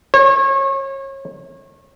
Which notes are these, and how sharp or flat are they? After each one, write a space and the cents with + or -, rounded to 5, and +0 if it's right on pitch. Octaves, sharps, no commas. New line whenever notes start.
C#5 -30